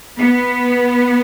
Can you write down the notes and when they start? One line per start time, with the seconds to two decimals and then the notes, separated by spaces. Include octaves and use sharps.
0.18 B3